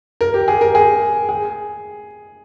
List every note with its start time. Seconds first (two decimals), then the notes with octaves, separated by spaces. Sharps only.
0.21 A#4
0.34 G4
0.48 G#4
0.61 A#4
0.75 G#4
1.29 G#4